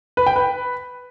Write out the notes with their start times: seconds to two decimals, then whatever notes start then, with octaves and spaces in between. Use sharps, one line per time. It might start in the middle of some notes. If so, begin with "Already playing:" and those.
0.17 B4
0.26 G5
0.36 B4